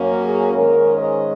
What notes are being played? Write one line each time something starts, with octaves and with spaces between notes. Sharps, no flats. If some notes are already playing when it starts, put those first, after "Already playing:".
Already playing: F#2 F#3 A#3 C#4
G#4
G#2 D#3 G#3 C#4 A#4
D#5